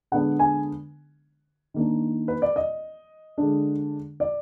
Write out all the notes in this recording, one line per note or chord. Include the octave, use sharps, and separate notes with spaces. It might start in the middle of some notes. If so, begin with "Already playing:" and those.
D3 G#3 B3 D4 F#5
G#5
D#3 A#3 D4
B4
D5
D#5
D3 G#3 D4
D5